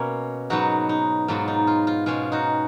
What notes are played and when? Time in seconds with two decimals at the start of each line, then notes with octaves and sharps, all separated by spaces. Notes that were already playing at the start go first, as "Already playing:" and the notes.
Already playing: B2 A#3 C#4
0.50 G#2 F#3 B3 D#4 F#4
0.89 D#4
1.28 G#2 F#3 B3 F4
1.48 D#4
1.67 F4
1.87 F4
2.06 B2 G#3 C#4 F4
2.32 D#4 F#4